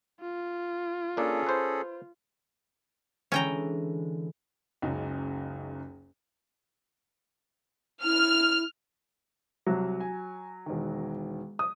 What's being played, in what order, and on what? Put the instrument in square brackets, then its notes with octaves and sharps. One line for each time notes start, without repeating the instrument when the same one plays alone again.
[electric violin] F4
[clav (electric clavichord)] A#3 D4 [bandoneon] C#4 G#4 A4
[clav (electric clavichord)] B4 C5
[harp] D3 E3 G#3 [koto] C#4 G5 A#5
[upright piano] F#1 C#2 D#4
[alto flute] E4 [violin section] F6
[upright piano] C2 [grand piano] F#3
[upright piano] G#5
E1 D#3
[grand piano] D#6